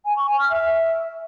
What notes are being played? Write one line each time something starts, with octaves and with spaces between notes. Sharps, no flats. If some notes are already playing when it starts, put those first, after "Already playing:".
G#5
C#6
G#5
F6
E5